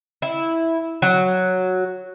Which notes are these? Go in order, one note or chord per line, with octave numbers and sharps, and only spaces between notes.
E4
F#3